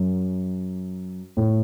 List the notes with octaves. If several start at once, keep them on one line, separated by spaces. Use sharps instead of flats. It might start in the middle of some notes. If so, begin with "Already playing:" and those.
Already playing: F#2
A2